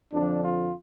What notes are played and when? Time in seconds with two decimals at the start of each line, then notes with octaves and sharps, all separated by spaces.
0.13 F2 D3 F3 D4
0.43 F4